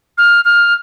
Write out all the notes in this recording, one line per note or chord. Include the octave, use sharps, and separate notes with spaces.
F6
F6